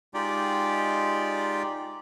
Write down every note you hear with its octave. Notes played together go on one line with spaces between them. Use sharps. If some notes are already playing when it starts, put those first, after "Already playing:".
G#3 D#4 F4 G4 D5 G5